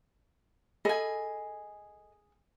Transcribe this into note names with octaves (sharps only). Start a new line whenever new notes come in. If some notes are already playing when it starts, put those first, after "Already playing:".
G#4 A4 D#5 G#5 B5